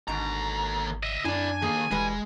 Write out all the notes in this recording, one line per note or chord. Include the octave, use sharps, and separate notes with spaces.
G#1 D#2 G#2 B2 D3 A#5
D#5 E5
F#2 D4 E4 D5 G#5
D#3 A#3 G#4
E1 E3 G3 G#3 B4